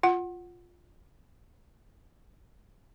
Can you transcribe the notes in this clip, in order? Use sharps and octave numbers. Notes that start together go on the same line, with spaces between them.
F4 F#5